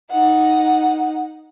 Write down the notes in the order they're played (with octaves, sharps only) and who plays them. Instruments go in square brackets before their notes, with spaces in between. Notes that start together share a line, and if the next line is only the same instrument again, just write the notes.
[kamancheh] D#4 F#5